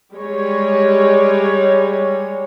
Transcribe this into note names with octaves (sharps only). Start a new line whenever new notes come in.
G3 G#3 C#5